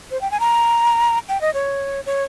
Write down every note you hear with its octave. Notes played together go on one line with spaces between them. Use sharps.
C5
G5
G#5
A#5
G5
D#5
C#5
C#5